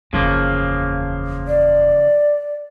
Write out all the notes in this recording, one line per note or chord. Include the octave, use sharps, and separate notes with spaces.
F#1 E2 C#3 F3 A#3
D5